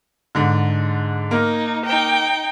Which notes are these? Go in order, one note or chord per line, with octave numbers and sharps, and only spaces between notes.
G#2 D3
A#3 D#4
D#4 G5